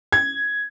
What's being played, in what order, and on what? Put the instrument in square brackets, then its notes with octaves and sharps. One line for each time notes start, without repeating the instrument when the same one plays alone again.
[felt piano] G#6